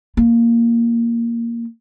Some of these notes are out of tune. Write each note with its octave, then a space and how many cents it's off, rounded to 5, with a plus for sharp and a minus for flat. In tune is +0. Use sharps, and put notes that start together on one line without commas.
A#3 +0 F4 -20